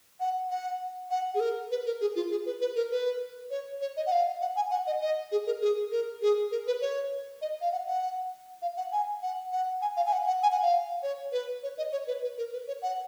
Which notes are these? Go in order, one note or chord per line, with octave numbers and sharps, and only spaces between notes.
F#5
F#5
F#5
G#4
A#4
B4
A#4
G#4
F4
G#4
B4
B4
A#4
B4
C#5
C#5
D#5
F#5
F5
F#5
G#5
F#5
D#5
D#5
G#4
A#4
G#4
A#4
G#4
A#4
B4
C#5
D#5
F5
F#5
F#5
F5
F#5
G#5
F#5
F#5
G#5
F5
G#5
F#5
F#5
G#5
F#5
F5
C#5
B4
C#5
D#5
C#5
B4
B4
A#4
B4
C#5
F#5